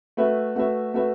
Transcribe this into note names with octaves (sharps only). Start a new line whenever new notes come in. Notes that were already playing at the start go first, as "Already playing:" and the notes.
A3 F#4 B4 E5
A3 F#4 B4 E5
A3 F#4 B4 E5